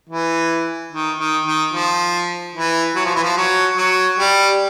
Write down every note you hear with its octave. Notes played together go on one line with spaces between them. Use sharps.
E3
D#3
D#3
D#3
F3
E3
F#3
F3
E3
F3
F#3
F#3
G3